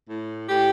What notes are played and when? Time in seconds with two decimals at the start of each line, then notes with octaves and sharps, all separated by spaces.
0.09 A2
0.49 A2 G4